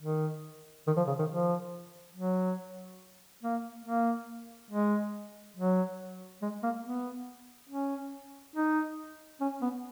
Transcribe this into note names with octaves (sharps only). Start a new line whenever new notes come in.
D#3
D#3
F3
C#3
D#3
F3
F#3
A#3
A#3
G#3
F#3
G#3
A#3
B3
C#4
D#4
C#4
B3